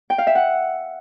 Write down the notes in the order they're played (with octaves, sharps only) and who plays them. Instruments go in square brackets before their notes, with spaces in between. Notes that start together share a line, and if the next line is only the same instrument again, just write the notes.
[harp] G5
F5
E5
F#5